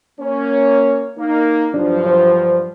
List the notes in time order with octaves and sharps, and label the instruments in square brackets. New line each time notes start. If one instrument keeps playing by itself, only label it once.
[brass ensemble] A#3 C#4 C#5
A#3 D#4
[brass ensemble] G2 F3 F#3 [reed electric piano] D4
[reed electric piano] C5